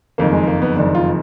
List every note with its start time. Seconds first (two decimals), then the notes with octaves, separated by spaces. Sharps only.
0.18 F#1 F2 D#3 A#3
0.33 G#3
0.47 A#3
0.62 B3
0.76 F#1 F2 D#3 D4
0.95 F4